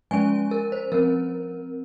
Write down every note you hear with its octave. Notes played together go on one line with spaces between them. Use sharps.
F3 G#3 C#4 G#5
A#4
C5
F3 C4 A#4